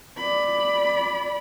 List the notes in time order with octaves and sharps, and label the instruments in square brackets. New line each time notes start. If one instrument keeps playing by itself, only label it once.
[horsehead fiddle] D5 B5